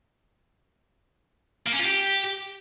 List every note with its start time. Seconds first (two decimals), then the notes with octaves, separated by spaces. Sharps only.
1.67 A#3
1.73 C#4
1.79 F4
1.85 G4